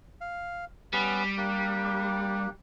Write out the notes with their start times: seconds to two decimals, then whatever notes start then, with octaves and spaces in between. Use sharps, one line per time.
0.21 F5
0.93 G3 B3 C#4 B4
1.37 A#3 D4 G4